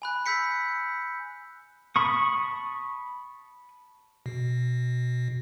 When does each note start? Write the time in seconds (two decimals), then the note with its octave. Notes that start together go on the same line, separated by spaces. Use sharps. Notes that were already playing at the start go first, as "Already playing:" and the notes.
0.02 G#5 B5 F#6
0.26 B5 E6 G6 B6 C#7
1.96 A5 B5 C#6 D#6
4.26 B2